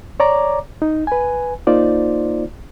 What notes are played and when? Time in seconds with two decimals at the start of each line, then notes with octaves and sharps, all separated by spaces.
0.20 C#5 D5 A#5 D6
0.82 D#4
1.07 B4 G#5
1.67 A#3 D#4 F4 C5 D5